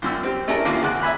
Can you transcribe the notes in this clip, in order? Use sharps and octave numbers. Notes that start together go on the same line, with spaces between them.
A#1 F#2 E6
C4 G4
A3 C#4 D4 E4 G#4 A#4
A1 D#2 A#3 E4 F4
C#2 F#4 G#4 D6 F#6
E5 G#5 B5 F#6